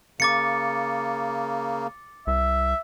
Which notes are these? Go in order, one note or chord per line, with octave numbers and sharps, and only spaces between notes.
C#3 A#3 D6 A6 C#7
C2 E5